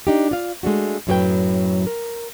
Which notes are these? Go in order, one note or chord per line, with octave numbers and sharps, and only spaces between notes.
D4 D#4 G4
F4 D5 F5
G#3 A3 D4 F#4
F#2 A2 F#3 G4 B4 G5
A#4